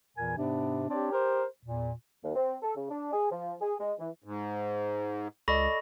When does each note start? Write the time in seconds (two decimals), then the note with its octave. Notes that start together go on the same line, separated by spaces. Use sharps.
0.17 E2 A#2 E3 A#4 G#5
0.37 G#2 C3 B3 D4
0.90 C4 D4 G4 C#5 D5
1.12 G4 A#4 C5
1.65 E2 A#2
2.23 D#2
2.35 C4
2.62 A4
2.77 C#3
2.90 D4
3.13 G#4
3.30 F3
3.61 G#4
3.80 G#3
3.99 E3
4.24 G#2
5.48 C#2 A4 D5 D#5 B5 C#6 A#6